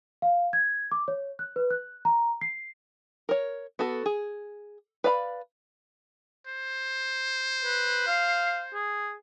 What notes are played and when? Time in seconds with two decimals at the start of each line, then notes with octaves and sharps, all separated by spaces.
0.22 F5
0.53 G#6
0.92 D6
1.08 C#5
1.39 F#6
1.56 B4
1.71 F#6
2.05 A#5
2.41 C7
3.29 A#4 C#5
3.79 B3 F#4 A4
4.06 G#4
5.04 B4 D5 F5 A#5 B5
6.47 C5
7.64 B4
8.07 F5
8.74 G#4